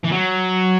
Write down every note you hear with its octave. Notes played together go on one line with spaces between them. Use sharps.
E3
F#3